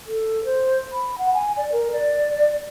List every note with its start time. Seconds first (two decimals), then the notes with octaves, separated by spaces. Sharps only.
0.07 A4
0.45 C5
0.92 B5
1.18 F#5
1.34 G#5
1.57 D5
1.72 A#4
1.92 D5